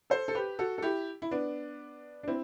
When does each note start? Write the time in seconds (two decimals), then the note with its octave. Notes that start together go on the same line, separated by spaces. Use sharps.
0.10 A4 C5
0.28 A4
0.35 G4 B4
0.59 F#4 A4
0.78 A4
0.82 E4 G4
1.22 E4
1.31 B3 D4
2.23 D4
2.28 C4 E4